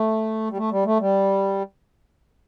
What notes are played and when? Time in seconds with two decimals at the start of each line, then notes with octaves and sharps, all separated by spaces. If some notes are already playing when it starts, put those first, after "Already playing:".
Already playing: A3
0.50 G3
0.57 A3
0.71 G3
0.85 A3
1.00 G3